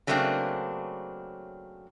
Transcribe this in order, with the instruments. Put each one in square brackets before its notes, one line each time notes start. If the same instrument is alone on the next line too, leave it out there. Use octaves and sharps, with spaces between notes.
[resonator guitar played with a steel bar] C#3 F#3 A3 A#3 C4 D4